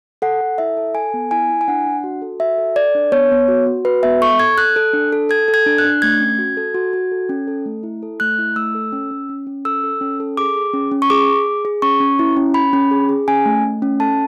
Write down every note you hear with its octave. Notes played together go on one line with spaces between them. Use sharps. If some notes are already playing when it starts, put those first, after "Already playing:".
A4 F#5
A4
E4 E5
A4
A4 G#5
B3
E4 G#5
E4
G#5
D4 F#5
D4
F#4
A4
F#4 E5
A4
A4 D5
D4
B3 C#5
B3
F#4
F#4
F#4 B4
B3 E5
A4 C#6
A4 G#6
A4 F#6
A4
D4
A4
A4 G#6
A4
G#6
D4
F#6
D4
A3 G#6
C#4
F#4
A4
F#4
F#4
A4
C#4
A4
A3
E4
A4
A3 F#6
E4
A3 E6
A4
C#4
C#4
C#4
C#4
A4 E6
A4
C#4
A4
G#4 D6
G#4
C#4
C#4
C#6
G#4 D6
G#4
G#4
G#4
C#4 C#6
C#4
E4
C#4
C#4 B5
C#4
G#4
G#4
C#4 G#5
A3
A3
C#4
A4 A5